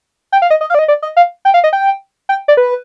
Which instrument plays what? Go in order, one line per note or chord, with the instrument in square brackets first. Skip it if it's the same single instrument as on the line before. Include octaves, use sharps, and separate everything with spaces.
[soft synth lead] G5
F5
D#5
D#5
F5
D5
D#5
D5
D#5
F5
G5
F5
D#5
G5
G5
D5
B4